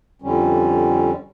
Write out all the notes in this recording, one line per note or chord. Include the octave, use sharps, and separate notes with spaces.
F2 D3 G3 C#4